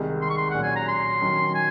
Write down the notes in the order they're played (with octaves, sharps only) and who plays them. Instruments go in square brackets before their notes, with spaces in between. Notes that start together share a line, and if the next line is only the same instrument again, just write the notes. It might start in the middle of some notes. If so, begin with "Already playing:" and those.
Already playing: [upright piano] C2 C3 D#3 G#3
[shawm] C6
C#6
C6
[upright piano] A#2 F#3 C#4 [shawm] F#5
[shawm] G#5
A#5
C6
[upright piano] D#3 F#3 C#4
[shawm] G#5